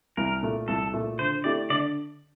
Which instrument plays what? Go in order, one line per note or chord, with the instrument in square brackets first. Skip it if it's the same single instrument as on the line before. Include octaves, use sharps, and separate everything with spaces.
[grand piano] C2 [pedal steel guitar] A#4
[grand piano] A#2 A3
[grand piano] C2 [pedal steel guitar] A4
[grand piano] A#2 A3
[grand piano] D3 [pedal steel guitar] C5
[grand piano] A3 E4 G4 [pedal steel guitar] D5
[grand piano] D3 [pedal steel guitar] D5